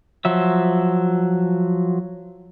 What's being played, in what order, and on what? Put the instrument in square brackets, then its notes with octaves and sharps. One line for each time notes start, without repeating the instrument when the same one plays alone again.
[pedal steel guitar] F3 F#3 E5